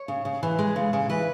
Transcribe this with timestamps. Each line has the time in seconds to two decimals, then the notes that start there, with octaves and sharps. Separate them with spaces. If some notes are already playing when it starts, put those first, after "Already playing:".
Already playing: C#5
0.08 C#3
0.25 C#3
0.43 E3
0.59 G#3
0.76 C#3
0.93 C#3
1.09 E3 B4